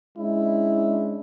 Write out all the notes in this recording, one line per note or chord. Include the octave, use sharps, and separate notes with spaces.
G#3 C#4 D4 E4